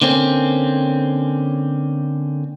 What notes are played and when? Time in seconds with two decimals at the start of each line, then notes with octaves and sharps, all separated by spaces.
0.02 D3 A#3 C4 C#4